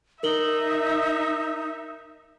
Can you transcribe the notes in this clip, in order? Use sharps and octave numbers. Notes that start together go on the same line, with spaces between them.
D#4 A#4 E5 F#7 G7